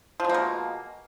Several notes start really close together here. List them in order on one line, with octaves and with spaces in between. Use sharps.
F3 G#3 A#3 B2